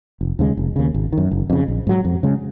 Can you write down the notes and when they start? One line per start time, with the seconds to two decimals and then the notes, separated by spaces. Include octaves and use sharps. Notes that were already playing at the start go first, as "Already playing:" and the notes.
0.21 F1
0.39 D#2 C#3 G#3
0.57 F1
0.76 D#2 C#3
0.94 G#1
1.13 D#3
1.18 F#2
1.31 F#1
1.50 F2 C#3
1.68 A#1
1.87 G#2 F#3
2.05 F2
2.23 C#3 G#3